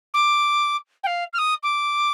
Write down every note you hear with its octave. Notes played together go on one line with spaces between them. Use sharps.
D6
G5
F5
F6
D#6
D6